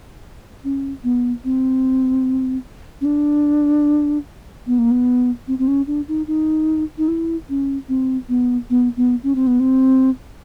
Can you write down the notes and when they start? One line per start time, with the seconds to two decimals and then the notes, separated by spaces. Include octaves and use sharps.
0.64 C#4
1.03 B3
1.44 C4
3.01 C#4
3.05 D4
4.67 B3
4.78 A#3
4.91 B3
5.48 C4
5.58 C4
5.67 C#4
5.87 D4
6.08 D#4
6.27 D#4
6.98 D#4
7.08 E4
7.49 C#4
7.89 C4
8.29 B3
8.70 B3
8.96 B3
9.23 C#4
9.35 C4
9.47 B3
9.60 C4